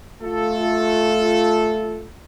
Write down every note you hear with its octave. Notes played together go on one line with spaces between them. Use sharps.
A3 F4 A4